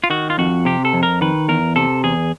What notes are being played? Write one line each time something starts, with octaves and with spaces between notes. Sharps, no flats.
F4
D#3 F#4
F4
F2 F#4
C3 G4
A4
F2
A#4
D#3 B4
E2 A#4
C3 A4
E2 G#4